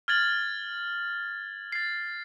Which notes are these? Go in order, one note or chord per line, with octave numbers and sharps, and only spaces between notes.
F6 G#6 A6 F#7
A6 C7